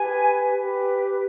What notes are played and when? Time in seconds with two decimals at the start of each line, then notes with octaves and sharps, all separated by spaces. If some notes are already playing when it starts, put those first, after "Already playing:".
Already playing: G4 B4 G#5
0.55 G4 B4